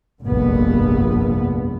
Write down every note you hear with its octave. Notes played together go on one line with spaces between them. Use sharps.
F1 A#1 G2 B3